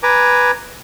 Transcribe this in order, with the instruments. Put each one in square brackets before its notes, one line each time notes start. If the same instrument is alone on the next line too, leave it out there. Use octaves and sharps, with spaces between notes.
[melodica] B4 G#5 A#5 D6